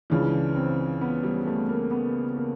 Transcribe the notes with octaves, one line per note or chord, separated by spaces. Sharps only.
C#2 C#3 E3 D4
C4
B3
G3
A3
A#3
B3
A#3